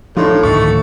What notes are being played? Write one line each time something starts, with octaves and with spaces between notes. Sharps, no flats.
A2 F3 D4 D#4 F4
D2 A2 D#3 A3 C#6